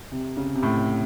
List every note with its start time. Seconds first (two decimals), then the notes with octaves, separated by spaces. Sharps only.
0.12 C3
0.37 C#3
0.55 C3
0.63 A2